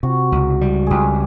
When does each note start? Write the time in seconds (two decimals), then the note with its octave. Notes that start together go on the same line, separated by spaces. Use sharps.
0.03 C3 F#4
0.32 C#2
0.61 G3
0.87 C#2 G4 G#4